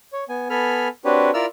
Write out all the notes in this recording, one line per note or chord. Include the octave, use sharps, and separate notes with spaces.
C#5
B3 G#5
B3 A4 G#5 B5 F6
C4 D4 F#4 G4 B4 C#5
E4 F4 A#4 D5 E6 F6